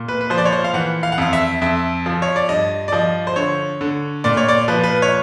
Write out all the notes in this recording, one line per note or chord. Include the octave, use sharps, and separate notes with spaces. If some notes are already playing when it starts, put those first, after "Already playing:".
Already playing: A#2
B4
B4
F3 C5
D5
C#5
C5
F5
E3 F#5
F5
F#5
F2 F5
E5
F2 E5
F3
C#5
D5
G2 D#5
D5
F3 D#5
C5
D3 C#5
D3
A#2 D5
C#5
D5
F3 B4
B4
C#5